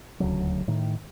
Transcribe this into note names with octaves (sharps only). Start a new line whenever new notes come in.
D#1 D2 C#3 F#3
A2 D#3